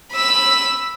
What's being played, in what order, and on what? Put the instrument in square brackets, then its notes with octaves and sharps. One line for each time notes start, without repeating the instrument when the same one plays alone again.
[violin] B5 E6